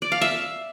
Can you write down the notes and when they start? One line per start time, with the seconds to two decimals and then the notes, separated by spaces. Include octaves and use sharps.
0.02 D5
0.12 F5
0.21 E5